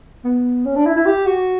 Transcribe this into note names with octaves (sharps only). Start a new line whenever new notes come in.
B3
C#4
D4
E4
E4
G4
F#4